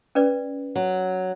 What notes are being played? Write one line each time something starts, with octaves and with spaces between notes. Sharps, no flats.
C#4 B4 D5
F#3